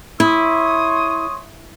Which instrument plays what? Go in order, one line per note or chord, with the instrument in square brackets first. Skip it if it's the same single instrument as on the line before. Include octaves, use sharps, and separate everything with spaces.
[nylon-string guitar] E4 [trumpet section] C#5 C6 D#6